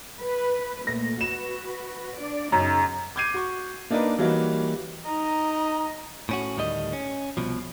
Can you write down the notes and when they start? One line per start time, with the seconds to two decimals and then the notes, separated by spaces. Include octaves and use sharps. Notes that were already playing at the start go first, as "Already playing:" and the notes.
0.21 B4
0.87 A#2 A3 A#6
1.21 F#4 B4 E7
2.16 D4 D5
2.52 F#2 C#3 D#4
3.16 D6 G6 G#6 C7 D#7
3.34 F#4 C#6
3.90 A#3 D4 D#4 A#4 B4
4.19 E3 F#3 G3 A#3 D#4 F#4
5.05 D#4 D#5 A#5
6.29 A2 C#4 F#4
6.57 D2 A2 D#3 G3 F#4 D#5
6.93 C#4
7.37 C2 B2 F3